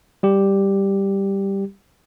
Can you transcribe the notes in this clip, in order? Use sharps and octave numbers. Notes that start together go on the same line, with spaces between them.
G3 G4